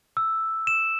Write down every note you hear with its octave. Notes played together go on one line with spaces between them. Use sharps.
E6
E7